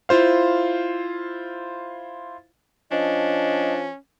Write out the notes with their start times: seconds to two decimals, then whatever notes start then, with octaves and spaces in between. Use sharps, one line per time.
0.09 E4 F4 C5 F5
2.91 F3 C#4 D4 D#5